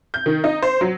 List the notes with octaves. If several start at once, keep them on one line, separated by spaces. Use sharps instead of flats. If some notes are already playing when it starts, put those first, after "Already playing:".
G6
D#3
D#4
C5
F#3